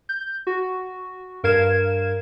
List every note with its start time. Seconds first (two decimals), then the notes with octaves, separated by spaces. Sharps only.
0.09 G6
0.47 F#4
1.43 G2 A#4 F5 G#6 E7